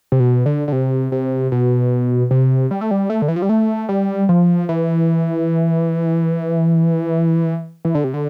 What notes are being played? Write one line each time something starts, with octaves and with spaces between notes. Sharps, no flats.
C3
B2
D3
D3
C3
C3
B2
C3
G3
A3
G3
A3
D3
E3
F3
G3
A3
G3
F3
E3
E3
D3
C3
D3